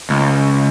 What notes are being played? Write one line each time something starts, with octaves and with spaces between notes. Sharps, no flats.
C#2